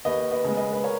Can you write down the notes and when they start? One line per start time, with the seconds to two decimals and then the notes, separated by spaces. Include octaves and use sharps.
0.05 D#2 B4 D#5
0.31 B4 D#5
0.44 C#3 G#3
0.57 B4 D#5
0.73 B4
0.84 A#4 C#5